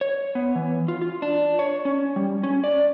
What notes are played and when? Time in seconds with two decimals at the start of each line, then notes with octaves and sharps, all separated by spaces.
0.01 C#5
0.35 B3
0.55 E3
0.88 F4
1.02 F4
1.22 D4
1.59 C#5
1.85 C#4
2.16 G3
2.43 C#4
2.64 D5